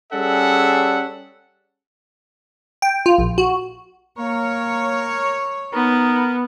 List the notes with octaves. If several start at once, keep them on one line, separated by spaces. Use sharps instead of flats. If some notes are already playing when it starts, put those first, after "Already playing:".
G3 C#4 G#4 A4 E5 F#5
G5
F4
A#1
F#4
A#3 A#4 C#5
B3 D#4 A#4